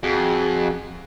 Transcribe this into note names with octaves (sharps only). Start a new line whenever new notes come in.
F2 F#4 G#4